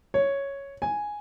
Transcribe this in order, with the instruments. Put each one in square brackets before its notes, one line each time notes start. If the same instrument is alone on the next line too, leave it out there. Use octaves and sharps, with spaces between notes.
[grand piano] C#5
G#5